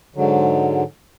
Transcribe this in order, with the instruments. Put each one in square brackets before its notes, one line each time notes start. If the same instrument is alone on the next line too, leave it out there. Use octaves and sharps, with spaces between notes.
[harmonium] G#2 D3 F#3